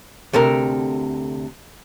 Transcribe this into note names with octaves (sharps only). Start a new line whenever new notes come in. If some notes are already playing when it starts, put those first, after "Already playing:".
D2 C3 A4 A#4